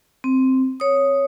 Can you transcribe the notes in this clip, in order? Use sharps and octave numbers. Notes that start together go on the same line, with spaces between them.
C4
C#5 D#6